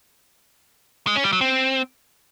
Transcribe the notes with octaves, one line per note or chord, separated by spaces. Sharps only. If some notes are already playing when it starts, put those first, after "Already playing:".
G#3
C#4
G3
F#3
C4